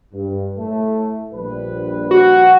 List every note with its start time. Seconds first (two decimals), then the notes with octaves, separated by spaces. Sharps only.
0.13 G2
0.58 A2 A3
1.33 A#1 G3 B4
2.11 F#4